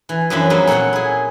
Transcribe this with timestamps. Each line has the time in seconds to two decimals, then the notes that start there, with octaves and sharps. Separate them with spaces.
0.09 E3
0.30 F#2 E3 F3 C4 D4 B5
0.50 F#3 G3 A#3 C4 G#4
0.67 A#2 A4 C#5 F#5 C6
0.93 E4 G#4